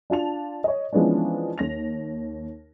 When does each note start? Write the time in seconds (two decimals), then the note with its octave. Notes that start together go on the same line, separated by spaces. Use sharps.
0.10 D4 F4 A5 F7
0.64 C#5 D#5
0.93 E3 F3 G#3 B3 C#4 D4
1.58 D#2 A#6 F7